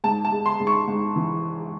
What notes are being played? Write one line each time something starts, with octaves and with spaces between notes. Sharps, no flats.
G#2 A5
A5
G#3
C6
G#2
C#6
G#2
E3